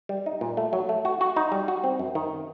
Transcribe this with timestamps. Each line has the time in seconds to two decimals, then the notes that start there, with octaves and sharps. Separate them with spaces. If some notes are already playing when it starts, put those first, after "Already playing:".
0.09 G3
0.26 D#4
0.41 A#2
0.57 A3
0.73 F#3
0.89 A3
1.05 F#4
1.21 F#4
1.36 D#4
1.52 G3
1.68 F#4
1.84 C4
1.99 F#2
2.15 D#3